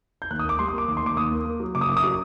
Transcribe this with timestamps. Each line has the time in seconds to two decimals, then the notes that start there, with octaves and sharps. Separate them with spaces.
0.22 G6
0.30 D#2 F#6
0.39 D#6
0.45 A#3 D6
0.59 G3 C6
0.68 D#6
0.73 A#3
0.78 D6
0.88 D#2
0.97 C6
1.03 D#2 D6
1.16 D#2 D#6
1.31 A#3
1.45 A#3
1.60 F#3
1.75 F#1 D6
1.81 D#6
1.88 F#2 D6
1.97 D#6
2.04 F#3 D6